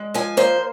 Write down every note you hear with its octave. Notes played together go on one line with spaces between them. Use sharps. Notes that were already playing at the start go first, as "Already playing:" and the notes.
Already playing: G#3
F3 G#5
A#3 C5